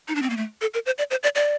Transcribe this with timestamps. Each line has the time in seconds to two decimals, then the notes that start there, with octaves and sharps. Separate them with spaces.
0.08 D#4
0.15 D4
0.22 C4
0.30 A#3
0.37 A3
0.61 A4
0.74 A#4
0.86 C5
0.98 D5
1.11 C5
1.23 D5
1.35 D5